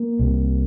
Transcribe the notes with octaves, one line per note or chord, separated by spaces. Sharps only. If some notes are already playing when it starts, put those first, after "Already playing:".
Already playing: A#3
C2 C3